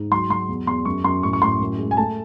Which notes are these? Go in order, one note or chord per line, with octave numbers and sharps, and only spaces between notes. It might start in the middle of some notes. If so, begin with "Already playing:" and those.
Already playing: G#2
F#3 C6
F#3 C6
E2
E2 C6
F#2 C#6
F#2 C6
A2 C#6
C#6
A2 C6
F#2
G#3
G#5
A3 A5